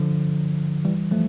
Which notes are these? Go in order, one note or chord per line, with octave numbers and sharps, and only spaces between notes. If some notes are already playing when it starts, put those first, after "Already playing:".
Already playing: D3 F3
E3 G3
F3 A3